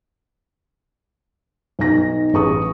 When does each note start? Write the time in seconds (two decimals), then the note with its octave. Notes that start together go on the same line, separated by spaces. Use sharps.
1.79 B1 D#4 A#6
2.33 A1 G#4 C#6 D#6